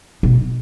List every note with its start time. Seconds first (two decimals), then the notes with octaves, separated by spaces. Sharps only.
0.23 B2